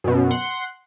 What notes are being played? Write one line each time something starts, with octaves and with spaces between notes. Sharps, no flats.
F#2 B2
F#5 C6